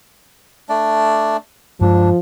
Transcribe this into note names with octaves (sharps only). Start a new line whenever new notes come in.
A3 D4 D5
G2 F3 G#3 D4